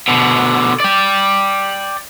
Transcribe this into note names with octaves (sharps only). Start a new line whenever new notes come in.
B2 D3
D5 G5